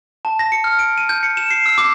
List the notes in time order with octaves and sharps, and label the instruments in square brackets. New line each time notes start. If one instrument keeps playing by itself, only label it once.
[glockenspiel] A5
A#6
C#7
F6
D7
D#7
G6
C#7
E7
C7
E6
D6